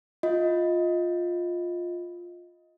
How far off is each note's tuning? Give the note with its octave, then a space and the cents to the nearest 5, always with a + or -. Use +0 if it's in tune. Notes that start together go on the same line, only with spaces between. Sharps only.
F4 +10 D#5 +20